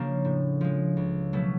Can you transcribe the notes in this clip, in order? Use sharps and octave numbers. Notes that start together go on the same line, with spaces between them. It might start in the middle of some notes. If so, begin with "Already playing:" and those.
Already playing: C#3 F3 A#3 D4
A2
F3 G#3
C#2
B2 F#3 A3